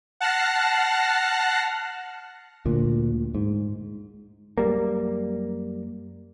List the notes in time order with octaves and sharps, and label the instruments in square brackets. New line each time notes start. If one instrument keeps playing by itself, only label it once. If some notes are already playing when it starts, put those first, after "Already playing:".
[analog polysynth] F#5 A5 F6 F#6 A#6 C7
[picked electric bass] D2 A#2
G#2
F#2 G3 A#3